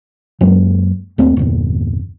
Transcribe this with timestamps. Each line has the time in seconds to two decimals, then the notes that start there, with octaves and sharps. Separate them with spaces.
0.41 F#2 F#3 G#3 A#3
1.18 D#2 A3 A#3 C4
1.37 G1 E2 A#2